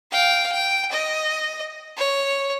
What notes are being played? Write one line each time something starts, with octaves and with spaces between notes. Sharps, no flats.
F5 G5
G5
D#5
C#5